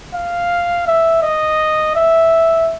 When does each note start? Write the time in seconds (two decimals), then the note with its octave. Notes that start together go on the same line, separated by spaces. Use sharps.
0.14 F5
0.87 E5
1.23 D#5
1.96 E5